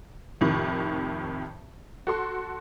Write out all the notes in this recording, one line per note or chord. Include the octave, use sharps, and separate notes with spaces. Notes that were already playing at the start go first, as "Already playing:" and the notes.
F2 A2 C3 D#3
F#4 A4 C6